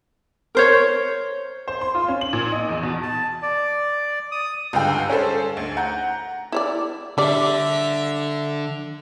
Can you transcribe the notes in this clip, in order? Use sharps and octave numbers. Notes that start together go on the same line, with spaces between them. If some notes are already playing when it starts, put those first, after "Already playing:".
A#4 C5 C#5
C5
C6
F4
C#4
F#7
A#2
D#5
E2
B2
A5
D5
D#6
C#2 G2 D3 G5
C#4 G#4 A4 C5
D2
F#5 A#5 G6
E4 C#5 D5
D3 G3 D5 E5